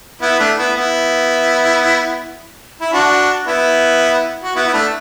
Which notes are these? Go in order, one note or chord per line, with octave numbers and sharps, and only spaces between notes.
B3 E4
A3 D4
B3 E4
B3 E4
E4
D4 F#4
B3 E4
F#4
B3 E4
E4
A3 D4